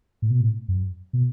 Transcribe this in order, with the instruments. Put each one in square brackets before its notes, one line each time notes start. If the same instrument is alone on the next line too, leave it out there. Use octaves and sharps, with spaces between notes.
[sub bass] A2
B2
A2
F#2
B2